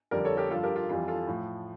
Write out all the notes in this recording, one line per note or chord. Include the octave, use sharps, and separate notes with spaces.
F2 D3 G3 A#4 D5
A4 C#5
G4 A#4
G2 F3 F4 A4
G4 A#4
F4
F2 E3 G3 F4
F4 A4
A2 F3